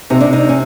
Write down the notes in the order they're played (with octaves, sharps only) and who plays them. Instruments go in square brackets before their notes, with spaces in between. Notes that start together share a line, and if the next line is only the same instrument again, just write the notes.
[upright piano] C3 [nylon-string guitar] D#4
[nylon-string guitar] D4
D#4
C#4